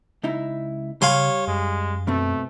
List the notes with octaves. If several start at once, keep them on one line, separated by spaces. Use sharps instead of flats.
C#2 D#4 E4
C#3 G3 C#5 F5 G#5 C6
F#2 G#3
B2 A3 C4